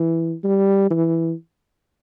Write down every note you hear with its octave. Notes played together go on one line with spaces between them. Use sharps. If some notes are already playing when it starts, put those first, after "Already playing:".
Already playing: E3
G3
E3